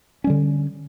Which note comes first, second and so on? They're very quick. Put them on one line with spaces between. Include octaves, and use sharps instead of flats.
C#4 G3 D3